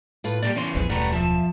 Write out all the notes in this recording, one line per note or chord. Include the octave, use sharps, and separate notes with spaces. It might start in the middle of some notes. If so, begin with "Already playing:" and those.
A2 F4 B4
A#2 G4 A4 D5 G5
E2 C#4 G4 C6
D#1 A1 D#2 E3 F3 G#4
D#1 F#2 B2 G3 A3 B4 F#5 A#5
F3 E5 A5